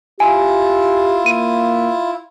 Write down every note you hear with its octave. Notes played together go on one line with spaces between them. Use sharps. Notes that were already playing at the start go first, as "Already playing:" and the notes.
E4 F4 G4 G#5
A#3 D#7